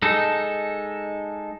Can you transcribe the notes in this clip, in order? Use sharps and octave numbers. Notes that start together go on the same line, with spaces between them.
G#3 D#4 A4